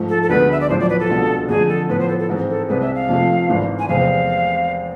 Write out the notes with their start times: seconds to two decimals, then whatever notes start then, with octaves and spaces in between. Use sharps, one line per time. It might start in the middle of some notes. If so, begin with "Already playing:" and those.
Already playing: G#2 F3 A3
0.09 A4
0.23 A4
0.29 D2 D3 G#3 B3 B4
0.52 E5
0.61 D5
0.69 B1 A2 F3 C5
0.80 D5
0.89 B4
1.00 A4
1.09 C2 B2 G#3 D4 F4
1.49 F2 D3 A3 G#4
1.69 A4
1.89 A2 F3 B3 B4
1.99 C5
2.09 A4
2.19 A4
2.29 G#2 E3 G#3 C4
2.49 A4
2.69 C2 C3 G#3 B4
2.82 E5
2.95 F5
3.08 F1 F2 C3 F3 A3
3.48 G#1 G#2 E3 A3
3.79 G#5
3.88 F1 E2 C3 G#3 C4 F5